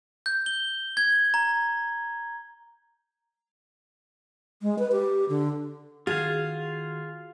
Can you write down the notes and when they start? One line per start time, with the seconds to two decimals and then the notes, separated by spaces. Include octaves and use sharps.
0.26 G6
0.46 G7
0.97 G#6
1.34 A#5
4.62 G#3
4.79 B4
4.92 G4
5.29 D3
6.07 D#3 F4 F#4 G#4 F5